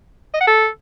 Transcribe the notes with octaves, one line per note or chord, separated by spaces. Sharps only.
D#5
F#5
A4